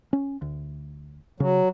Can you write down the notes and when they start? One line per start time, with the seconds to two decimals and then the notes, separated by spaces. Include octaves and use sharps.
0.13 C#4
0.42 D2
1.40 C#3 F#3